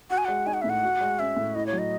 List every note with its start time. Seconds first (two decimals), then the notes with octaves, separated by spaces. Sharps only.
0.10 F#4 F#5
0.18 G#5
0.25 G#3 F#5
0.46 D#4 G#5
0.54 F#5
0.62 A2 E5
0.69 F#5
0.83 F#4
1.01 G#3
1.19 C#4 E5
1.36 A2
1.55 E4 D#5
1.67 C#5
1.73 F#3
1.78 D#5